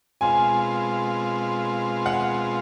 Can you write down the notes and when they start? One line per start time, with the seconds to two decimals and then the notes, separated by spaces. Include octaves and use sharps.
0.21 B2 G#3 C4 F4 G#5
2.06 F#5